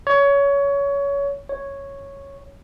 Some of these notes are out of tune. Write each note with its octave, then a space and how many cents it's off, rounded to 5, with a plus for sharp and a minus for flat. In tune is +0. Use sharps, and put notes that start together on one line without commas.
C#5 +20
C#5 -5